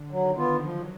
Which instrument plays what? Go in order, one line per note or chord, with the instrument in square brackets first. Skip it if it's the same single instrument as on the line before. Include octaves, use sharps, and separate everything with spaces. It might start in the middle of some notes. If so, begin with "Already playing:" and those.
Already playing: [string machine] D3
[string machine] D#3 [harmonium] F#3
[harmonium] B3 F4
[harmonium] F3 [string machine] F#3